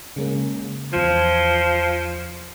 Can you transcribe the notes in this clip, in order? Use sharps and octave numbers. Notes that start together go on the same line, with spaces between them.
C#3 G#3 A#3
E2 F3 C6 G#6